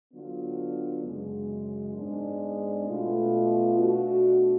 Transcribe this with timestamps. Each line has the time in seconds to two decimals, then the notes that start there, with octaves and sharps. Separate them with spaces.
0.12 D3 F#3 B3 D4 F4
1.03 F#2 C#3 G#3
1.94 G#2 G#3 B3 D4
2.87 B2 A3 F4
3.78 B2 A3 D4 F#4